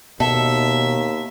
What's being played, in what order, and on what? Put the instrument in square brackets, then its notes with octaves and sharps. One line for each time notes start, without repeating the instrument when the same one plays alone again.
[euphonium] D#2 [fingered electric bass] B2 [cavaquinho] A4 [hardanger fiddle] E5